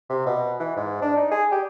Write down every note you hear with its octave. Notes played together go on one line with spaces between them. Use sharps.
C3
B2
E3
G#2
D4
D#4
G#4
G4